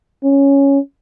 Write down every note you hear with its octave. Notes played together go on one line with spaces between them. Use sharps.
C#4